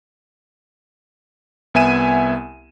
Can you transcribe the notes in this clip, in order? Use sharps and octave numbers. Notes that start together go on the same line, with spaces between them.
C2 B3 E5 G#5 D#7 E7